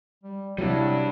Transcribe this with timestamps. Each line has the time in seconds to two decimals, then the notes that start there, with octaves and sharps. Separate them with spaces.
0.23 G3
0.58 C3 F#3 G3 D4 E4